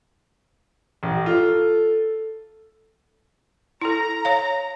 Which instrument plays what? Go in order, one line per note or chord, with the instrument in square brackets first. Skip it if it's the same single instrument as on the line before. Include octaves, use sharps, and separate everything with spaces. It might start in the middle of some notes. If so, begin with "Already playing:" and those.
[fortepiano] A1
[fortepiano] F4 [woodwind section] A4
[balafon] E4 A4 [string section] A#5
[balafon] C#5 F5